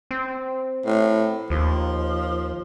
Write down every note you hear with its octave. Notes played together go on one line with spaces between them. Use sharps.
C4
A2
D#2 F3